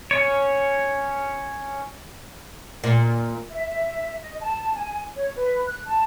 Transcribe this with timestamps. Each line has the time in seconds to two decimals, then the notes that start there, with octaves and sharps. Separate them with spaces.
0.11 C#4 C#5
2.84 A#2
3.51 E5
4.22 D#5
4.41 A5
4.74 G#5
5.16 C#5
5.36 B4
5.66 F#6
5.87 A5